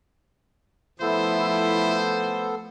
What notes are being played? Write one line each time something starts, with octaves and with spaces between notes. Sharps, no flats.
F3 A3 B3 E4 A4 C5